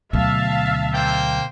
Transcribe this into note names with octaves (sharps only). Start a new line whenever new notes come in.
D2 B2 F#3 E5 F5 A5
A#3 C5 G5